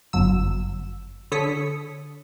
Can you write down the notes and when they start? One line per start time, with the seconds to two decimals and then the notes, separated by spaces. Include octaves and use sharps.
0.13 G1 F#2 F#3 E6
1.32 D3 A4 C#5 D#6 B6 C#7